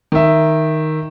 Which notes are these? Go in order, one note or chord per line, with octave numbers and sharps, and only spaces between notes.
D#3 E5